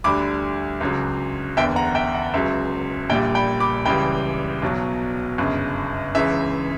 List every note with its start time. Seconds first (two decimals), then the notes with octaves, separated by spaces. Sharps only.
0.04 D2 D3 G3 B5 D6
0.81 C#2 C#3 F#3
1.57 F#1 E2 D3 E5 G5
1.76 F#5 A#5
1.95 E5 G5
2.15 F#5
2.34 C#2 C#3 F#3 E5
3.09 A#1 A#2 G3 E5 G5
3.35 G5 B5
3.60 B5 D6
3.85 C#2 C#3 E3 G3 G5 B5
4.62 B1 B2 F#3
5.38 G1 F#2 C#3
6.15 C#2 C#3 E3 E5